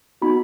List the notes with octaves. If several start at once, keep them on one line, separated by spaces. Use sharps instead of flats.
B3 D#4 F#4 B5